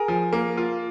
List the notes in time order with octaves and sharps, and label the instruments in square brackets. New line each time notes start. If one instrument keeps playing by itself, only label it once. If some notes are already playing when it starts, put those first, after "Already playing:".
Already playing: [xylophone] G#4 G#5 [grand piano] A#4
[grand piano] F3
A#3
F4